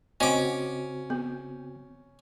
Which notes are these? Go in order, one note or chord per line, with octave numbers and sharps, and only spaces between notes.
C#3 C4 C#4 F#4 D#5 D6
B3